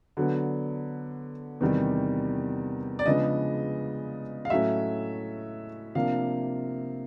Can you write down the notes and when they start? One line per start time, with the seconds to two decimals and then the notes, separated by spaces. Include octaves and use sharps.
0.17 D3 F#3 B3
1.61 E2 C3 D#3 G3
2.99 D5
3.06 C#3 F3 G#3 B3 D4 D#5
4.45 F5
4.50 A2 F#3 A3 C#4 E5
5.95 C3 F3 A#3 D4 F5